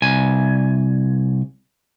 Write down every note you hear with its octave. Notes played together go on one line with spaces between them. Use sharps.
C2 G#5